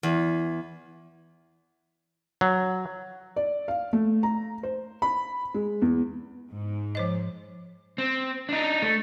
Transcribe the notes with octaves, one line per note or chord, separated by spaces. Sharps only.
E2
F#3
D5
F5
A3
A#5
C5
B5
G#3
E2
G#2
F3 C5 D#5
C4
D4 D#4
A3